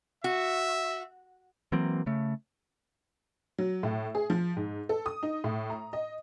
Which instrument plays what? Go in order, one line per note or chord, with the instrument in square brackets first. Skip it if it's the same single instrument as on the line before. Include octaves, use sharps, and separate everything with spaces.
[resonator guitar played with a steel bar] F#4 [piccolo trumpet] E5
[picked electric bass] E3 F#3 A#3 C4
C#3 A3
[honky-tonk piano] F#3
A2
G#4
F3
G#2
A4
D#6
D#4
A2
A#5
D#5